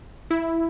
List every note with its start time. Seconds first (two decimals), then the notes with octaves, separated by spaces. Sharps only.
0.31 E4